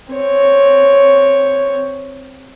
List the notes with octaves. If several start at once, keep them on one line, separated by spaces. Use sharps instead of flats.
C4 C#5